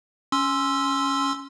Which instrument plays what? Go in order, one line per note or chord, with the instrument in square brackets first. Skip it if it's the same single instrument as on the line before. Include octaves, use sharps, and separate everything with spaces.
[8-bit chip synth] C#4 C6 E6